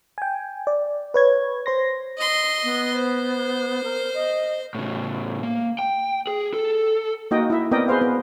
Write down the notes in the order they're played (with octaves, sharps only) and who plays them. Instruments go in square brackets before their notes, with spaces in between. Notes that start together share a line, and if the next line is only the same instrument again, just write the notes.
[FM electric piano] G5 G#5
D5
B4 C#5 G#6
C5 C6 A#6
[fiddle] D#5 C6
[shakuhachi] B3
[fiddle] C5
[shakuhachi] A#4
D#5
[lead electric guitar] A2 C#3
A#3
G5
G#4
A4
[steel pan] A#3 D#4 F#4 D#5 G5
E4 E5
B3 C4 A#4 D5 D#5 G5
G#4 B4 C5 F5
B3